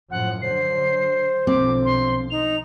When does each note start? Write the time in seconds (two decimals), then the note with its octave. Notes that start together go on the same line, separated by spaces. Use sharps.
0.11 F#2 A2 F3 F#5
0.42 D3 F#3 C5 C7
1.47 B1 D3 F3 C4 D6
1.85 C6
2.30 D#4 F7